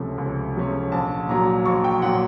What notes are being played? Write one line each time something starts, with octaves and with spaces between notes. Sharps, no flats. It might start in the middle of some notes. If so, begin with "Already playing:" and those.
Already playing: C#2 C3 F3 A3 C#4
C#2
C3 F3 A3 C#4
A#1 A5
A#2 F#3 A#5
A#1 C#6
G5
A#2 F#3 F#5